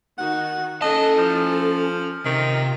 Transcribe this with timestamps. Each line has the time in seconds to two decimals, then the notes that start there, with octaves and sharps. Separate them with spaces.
0.18 D#3 D#4 F#4 F#5
0.82 C#4 A4 D#5 A5
1.18 F3
2.26 C3 D#3 F4